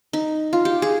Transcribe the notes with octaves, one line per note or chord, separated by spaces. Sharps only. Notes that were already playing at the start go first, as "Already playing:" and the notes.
D#4
F4
G4
G#4